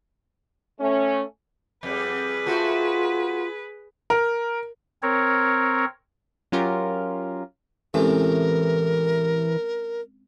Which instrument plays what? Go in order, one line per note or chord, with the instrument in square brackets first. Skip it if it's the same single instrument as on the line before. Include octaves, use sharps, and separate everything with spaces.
[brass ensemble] A3 C#4
[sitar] F2 G3 [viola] G#4 B4
[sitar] A3 F#4 C5 [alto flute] F4
[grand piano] A#4
[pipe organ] C4 A#4 C#5
[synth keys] F#3 C#4 F4 G4 A#4
[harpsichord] A2 C3 A3 [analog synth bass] E3 [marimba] G#3 C4 C#4 [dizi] A#4